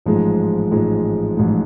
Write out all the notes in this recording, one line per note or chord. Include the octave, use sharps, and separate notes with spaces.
A1 G#2 F3 G#3
A1 G#2 F3 G#3
A1 G#2 F3 G#3